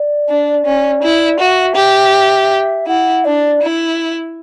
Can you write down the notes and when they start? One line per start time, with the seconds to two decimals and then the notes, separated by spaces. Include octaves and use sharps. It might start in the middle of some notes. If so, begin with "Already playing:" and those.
Already playing: D5
0.29 D4
0.66 C#4
1.03 E4
1.40 F#4 E5
1.76 G4
2.87 E4 F#5
3.24 D4 D5
3.61 E4